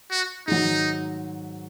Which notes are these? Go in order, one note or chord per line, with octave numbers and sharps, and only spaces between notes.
F#4
G#2 D#3 F#3 D#4